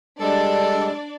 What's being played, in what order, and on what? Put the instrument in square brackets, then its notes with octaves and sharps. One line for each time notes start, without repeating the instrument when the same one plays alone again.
[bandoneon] G3 G#3 [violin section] D4 D5 [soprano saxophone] A4